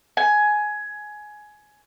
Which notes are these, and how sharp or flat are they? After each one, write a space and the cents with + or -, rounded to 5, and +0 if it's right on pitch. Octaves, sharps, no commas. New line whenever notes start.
G#5 +15